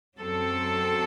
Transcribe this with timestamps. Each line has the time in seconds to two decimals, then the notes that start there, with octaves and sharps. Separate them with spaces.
0.19 F#2 F#3 C4 A4